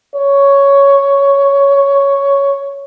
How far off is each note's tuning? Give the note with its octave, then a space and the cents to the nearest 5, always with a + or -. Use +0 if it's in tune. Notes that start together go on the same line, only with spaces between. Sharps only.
C#5 +5